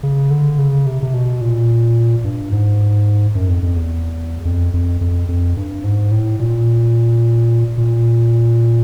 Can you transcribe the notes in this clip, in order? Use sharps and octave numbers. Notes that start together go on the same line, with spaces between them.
C#3
D3
C#3
C3
C3
B2
A#2
G2
G#2
F#2
F2
F2
E2
F2
F2
F2
F2
G2
G#2
A2
A#2
A#2